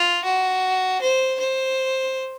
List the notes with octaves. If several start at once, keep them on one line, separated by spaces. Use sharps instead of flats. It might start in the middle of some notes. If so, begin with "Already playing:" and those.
Already playing: F4
F#4
C5
C5